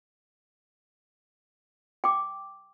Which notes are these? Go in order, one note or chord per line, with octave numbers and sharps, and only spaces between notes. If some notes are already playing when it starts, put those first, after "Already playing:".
G5 D6